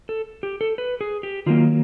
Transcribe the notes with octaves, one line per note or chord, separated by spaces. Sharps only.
A4
G4
A4
B4
G#4
G4
D#3 F#3 A#3 F4